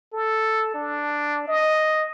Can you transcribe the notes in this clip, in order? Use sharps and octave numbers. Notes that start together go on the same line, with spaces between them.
A4
D4
D#5